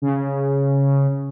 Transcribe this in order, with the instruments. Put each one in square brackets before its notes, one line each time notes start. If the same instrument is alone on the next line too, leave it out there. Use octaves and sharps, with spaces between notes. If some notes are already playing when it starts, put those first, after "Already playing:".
[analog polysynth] C#3